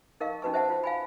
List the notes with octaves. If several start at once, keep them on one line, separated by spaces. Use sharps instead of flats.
D#4 A#4 D#5 F5 C#6
C#4 D#4 F#4 B4 A5 C#6
C5 E5 F#5 A5
F4 C5
F5 G#5 B5